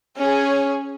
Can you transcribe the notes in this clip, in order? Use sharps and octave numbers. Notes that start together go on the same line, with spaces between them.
C#4 G#4 C#5